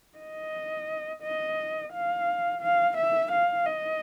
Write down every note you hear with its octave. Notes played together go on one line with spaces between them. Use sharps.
D#5
D#5
F5
F5
E5
F5
D#5